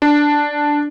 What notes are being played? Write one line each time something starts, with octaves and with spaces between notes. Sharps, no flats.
D4